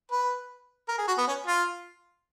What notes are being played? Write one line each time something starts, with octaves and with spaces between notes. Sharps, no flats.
B4
A#4
G#4
F#4
B3
C#4
F4